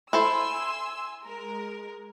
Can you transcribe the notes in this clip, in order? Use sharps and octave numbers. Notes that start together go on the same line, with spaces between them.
E4 A4 C5 G#5 C6 E6
G#3 A#4